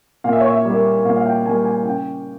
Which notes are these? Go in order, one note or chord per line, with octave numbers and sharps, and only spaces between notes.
A#2 F5
E5
C#5
E5
G3 A#3
A#2 F5
F5
G5
G3 A#3 G#5
G#5
C#3 G5